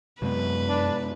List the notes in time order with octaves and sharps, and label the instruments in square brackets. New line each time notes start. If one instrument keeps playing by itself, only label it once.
[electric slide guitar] F#2 [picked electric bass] C3 G#3 B3 [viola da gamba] B4
[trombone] D4